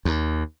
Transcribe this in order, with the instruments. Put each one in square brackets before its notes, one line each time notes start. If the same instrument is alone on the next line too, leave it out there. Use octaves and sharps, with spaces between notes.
[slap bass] D#2